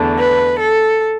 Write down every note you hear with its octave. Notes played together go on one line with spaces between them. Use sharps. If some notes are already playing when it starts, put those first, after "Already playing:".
Already playing: E2 D3 A3
B4
A4